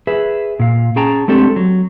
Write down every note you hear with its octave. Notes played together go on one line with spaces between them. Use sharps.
G#4 B4 E5
A#2 F5
C#4 G#4 G5 A5 A#5
G#3 A3 C4 D4 G4 A4
F#3